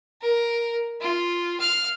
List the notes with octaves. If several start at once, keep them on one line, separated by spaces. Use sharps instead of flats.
A#4
F4
F5 F6